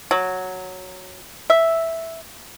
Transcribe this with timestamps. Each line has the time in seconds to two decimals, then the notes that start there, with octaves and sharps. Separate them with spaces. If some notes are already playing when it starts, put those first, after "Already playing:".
0.11 F#3
1.50 E5